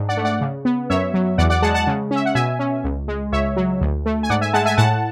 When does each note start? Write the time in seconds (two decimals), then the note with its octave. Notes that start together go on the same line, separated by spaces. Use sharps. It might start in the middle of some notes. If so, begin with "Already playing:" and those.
Already playing: G#2 D4
0.09 D5 F#5
0.17 A3
0.25 D5 F#5
0.41 C#3
0.65 B3
0.90 F#2 C#5 E5
1.14 F#3
1.38 E2 D5 F#5
1.50 D5 F#5
1.62 G#3 F#5 A5
1.74 F#5 A5
1.87 C#3
2.11 C#4
2.16 E5
2.25 F#5
2.35 B2 E5 G#5
2.59 C#4
2.84 C#2
3.08 G#3
3.32 C#2 C#5 E5
3.57 F#3
3.81 D2
4.06 A3
4.23 G#5
4.29 G#2 D5 F#5
4.41 E5 G#5
4.54 G#3 F#5 A5
4.66 E5 G#5
4.77 A2 F#5 A5